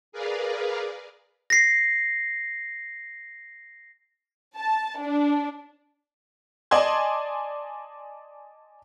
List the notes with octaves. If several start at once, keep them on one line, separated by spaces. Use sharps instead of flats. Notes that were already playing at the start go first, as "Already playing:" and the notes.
G#4 A#4 B4 D5 F5
A#6 C7
A5
D4
D5 D#5 G#5 A5 C6 G#6